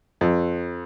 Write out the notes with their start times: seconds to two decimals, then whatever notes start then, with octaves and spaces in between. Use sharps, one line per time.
0.21 F2